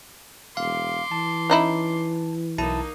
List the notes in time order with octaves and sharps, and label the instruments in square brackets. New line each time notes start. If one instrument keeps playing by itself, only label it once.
[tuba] E1 [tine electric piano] F5 [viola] C6 D6
[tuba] E3 [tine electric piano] A5
[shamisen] C#4 D#4 E4
[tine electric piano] B1 E4 A5 [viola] A#3 D#4